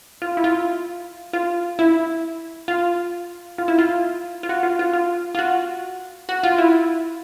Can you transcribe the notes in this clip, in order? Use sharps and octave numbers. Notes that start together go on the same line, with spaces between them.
F4
E4
F4
F4
E4
F4
F4
E4
F4
F4
F#4
F4
F4
F4
F4
F#4
F#4
F4
E4